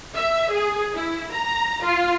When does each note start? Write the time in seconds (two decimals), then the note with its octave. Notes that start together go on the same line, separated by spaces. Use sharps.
0.14 E5
0.52 G#4
0.95 E4
1.34 A#5
1.85 F4